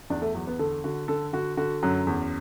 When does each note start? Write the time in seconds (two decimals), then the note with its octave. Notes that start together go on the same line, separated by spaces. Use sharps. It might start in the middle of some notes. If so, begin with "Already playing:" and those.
0.10 E2 D4
0.22 A3
0.35 E2 F#3
0.47 B3
0.59 D3 A4
0.84 D3 F#4
1.08 D3 A4
1.33 D3 F#4
1.57 D3 F#4
1.83 F#2 F#3
2.07 E2